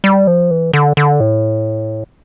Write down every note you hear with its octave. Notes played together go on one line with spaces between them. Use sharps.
G3
F3
E3
D3
D3
A2